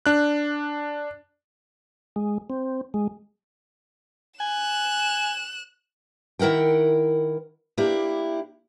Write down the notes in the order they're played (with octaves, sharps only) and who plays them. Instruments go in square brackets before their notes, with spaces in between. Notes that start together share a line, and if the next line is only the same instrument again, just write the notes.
[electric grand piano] D4 F#6
[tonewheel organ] G#3
C4
G#3
[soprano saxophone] G#5 [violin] F#6 E7
[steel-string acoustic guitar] D#3 E4 A#4 F#5 G5
A#3 D4 E4 G4